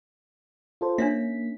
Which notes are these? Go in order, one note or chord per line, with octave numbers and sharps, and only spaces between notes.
F4 A4 C5
A#3 C#4 D4 C#5 E5 B6